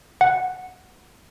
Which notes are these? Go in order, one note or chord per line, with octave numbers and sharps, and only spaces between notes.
F#5